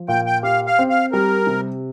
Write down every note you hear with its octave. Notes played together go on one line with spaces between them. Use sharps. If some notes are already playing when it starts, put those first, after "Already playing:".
Already playing: F3
A#2 G5
G5
G4 F5
F5
C4
F5
G3 A#4
C3